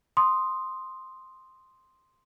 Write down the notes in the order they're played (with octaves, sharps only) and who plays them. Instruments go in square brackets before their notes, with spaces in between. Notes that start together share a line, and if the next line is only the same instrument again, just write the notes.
[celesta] C6 D#6